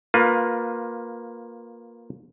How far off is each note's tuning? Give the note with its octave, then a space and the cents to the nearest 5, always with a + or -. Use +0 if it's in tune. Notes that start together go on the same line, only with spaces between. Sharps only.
A#3 +0 F4 +20 B4 +0